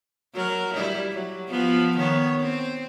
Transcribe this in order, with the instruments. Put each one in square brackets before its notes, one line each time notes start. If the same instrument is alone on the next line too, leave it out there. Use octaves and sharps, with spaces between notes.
[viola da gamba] F#3 A#4
G3 E4
F#3
F3 B3
D#3 B3 C#5
C4